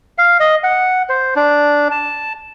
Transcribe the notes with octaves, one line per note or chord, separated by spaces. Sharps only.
F5
D#5
F#5
C5
D4
A5